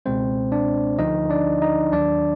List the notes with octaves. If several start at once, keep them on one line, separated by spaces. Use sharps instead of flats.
C#2 B2 G#3 C4 C5
D4 D5
D2 D3 F3 D#4 D#5
D4 D5
D#4 D#5
D#2 D#3 F#3 D4 D5